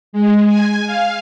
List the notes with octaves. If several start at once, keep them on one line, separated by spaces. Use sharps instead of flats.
G#3
G#5
F5